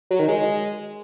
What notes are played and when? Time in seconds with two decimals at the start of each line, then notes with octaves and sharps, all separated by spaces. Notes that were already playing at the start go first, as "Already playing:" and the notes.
0.11 F#3
0.19 D#3
0.28 G#3